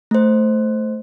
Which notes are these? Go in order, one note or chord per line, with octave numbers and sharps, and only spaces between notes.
A3 C5